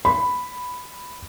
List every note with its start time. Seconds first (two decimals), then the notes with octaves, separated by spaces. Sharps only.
0.05 B5